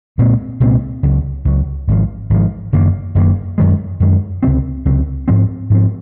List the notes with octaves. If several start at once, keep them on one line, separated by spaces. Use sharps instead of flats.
C2 A#2 G#3 C4
C2 A#2 G#3 C4
C#2 C#3 F#3
C#2 C#3 F#3
G#1 G#2 F3
G#1 G#2 F3
F#1 F#2 D#3 A#3
F#1 F#2 D#3 A#3
F#2 D#3 G#3
F#2 D#3 G#3
C#2 C3 F#3 C4
C#2 C3 F#3 C4
G#2 F3 C4
G#2 F3 C4